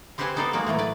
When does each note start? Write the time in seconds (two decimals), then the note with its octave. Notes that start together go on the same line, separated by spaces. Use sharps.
0.18 C4 G4 B4 C5 F#5 G#5
0.36 B3 D#4 A4 C5 D5 F5
0.53 G#3 A#3 F#4 D5
0.66 A2 E3 F#3 A3
0.79 B4 D5